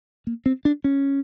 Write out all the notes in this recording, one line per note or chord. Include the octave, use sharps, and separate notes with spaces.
A#3
C4
D4
C#4